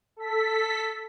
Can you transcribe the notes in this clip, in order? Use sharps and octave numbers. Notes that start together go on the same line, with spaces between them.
A4 B6